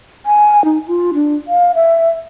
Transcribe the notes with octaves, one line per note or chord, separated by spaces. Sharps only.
G#5
D#4
F4
D4
F5
E5